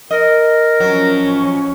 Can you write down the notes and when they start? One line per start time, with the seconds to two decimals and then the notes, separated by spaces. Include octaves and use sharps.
0.11 A#4 D#5
0.80 F3 F#3 C#4